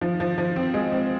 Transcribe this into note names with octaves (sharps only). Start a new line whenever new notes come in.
F3
F3
F3
C4
G#3
C4